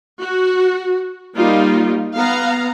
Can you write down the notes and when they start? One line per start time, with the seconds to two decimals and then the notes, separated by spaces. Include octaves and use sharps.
0.20 F#4
1.35 G3 A#3 D#4 F4
2.17 B3 F5 A#5